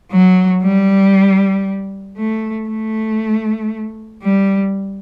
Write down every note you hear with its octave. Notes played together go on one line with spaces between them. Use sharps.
F#3
G3
A3
A3
G3